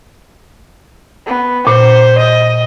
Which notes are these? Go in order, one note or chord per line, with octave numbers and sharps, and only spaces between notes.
B3
A#2 C5
D#5